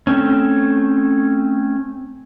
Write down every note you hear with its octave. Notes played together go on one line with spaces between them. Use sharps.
A3 C4 C#4